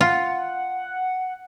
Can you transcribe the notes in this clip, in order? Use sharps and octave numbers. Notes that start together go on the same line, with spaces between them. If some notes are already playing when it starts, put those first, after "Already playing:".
F4 F#5